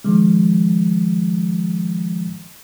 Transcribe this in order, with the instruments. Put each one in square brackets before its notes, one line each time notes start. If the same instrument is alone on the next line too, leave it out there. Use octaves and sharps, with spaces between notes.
[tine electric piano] D#3 F3 G#3